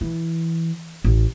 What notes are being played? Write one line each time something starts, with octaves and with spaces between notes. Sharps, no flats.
E3
A1